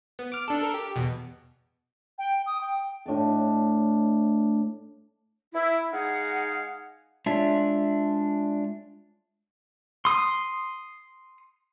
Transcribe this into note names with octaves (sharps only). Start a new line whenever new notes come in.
B3
D6 F6
D4 A4
A4 A#4
G4
E2 B2
G5
D#6
G5
A2 D4 D#5 A5
E4
G#3 D#4 G#4 F5 F#5
G#3 D4 F4 C#5 E5
C6 D#6